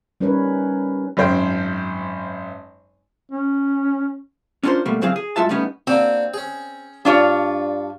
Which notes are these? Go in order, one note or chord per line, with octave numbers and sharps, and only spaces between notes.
G3 C#4 D#4 A#4 B4 C#5
G#1 F#2 C5 G5
C#4
C#4 D4 F4 G4 A#4 C5
B2 G3 A3 A#3
D2 F#3 C4 G#4 F5
G#4
G2 G#3 F4 F#4 E5 A5
G3 A3 B3 C#4 D#4
A#3 C4 D4 F#4
C#4 G#4
G2 D4 F4 C#5